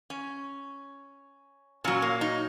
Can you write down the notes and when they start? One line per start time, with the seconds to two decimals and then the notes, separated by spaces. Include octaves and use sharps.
0.10 C#4
1.84 A#2 F#3 C#4
2.02 A#3
2.21 D#4